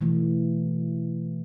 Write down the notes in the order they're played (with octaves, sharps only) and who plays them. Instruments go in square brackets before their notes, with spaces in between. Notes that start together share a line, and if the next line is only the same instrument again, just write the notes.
[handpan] B2 E3 A3